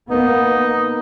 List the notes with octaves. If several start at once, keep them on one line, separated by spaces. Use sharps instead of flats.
A#3 B3 D#4